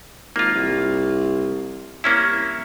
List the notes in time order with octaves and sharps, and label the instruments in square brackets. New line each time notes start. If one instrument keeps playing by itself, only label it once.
[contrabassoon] G#1 [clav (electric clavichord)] A#3 F4
[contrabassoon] C2
[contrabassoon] C2 [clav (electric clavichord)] A#3 C#4 E4